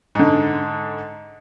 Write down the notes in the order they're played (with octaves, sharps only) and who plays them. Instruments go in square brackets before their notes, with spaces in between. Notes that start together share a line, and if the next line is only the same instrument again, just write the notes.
[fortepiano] G#2 D3